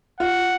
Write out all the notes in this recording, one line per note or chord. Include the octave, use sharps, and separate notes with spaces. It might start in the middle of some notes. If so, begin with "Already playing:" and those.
F4 F#5